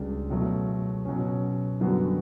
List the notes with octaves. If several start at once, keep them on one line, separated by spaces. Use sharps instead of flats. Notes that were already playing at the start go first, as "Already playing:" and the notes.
Already playing: C#2 C#3 G3 D4 F#4
B2 F#3 A3
B2 F#3 C#4
F#2 D3 G3 B3 F#4